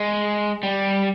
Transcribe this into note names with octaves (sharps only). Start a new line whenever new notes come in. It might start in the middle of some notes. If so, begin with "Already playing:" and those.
Already playing: G#3
G3